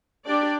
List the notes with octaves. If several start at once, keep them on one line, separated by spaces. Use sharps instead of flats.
D4 G4 D5